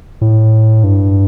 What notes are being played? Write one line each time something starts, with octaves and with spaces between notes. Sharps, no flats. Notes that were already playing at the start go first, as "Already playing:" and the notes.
A2
G2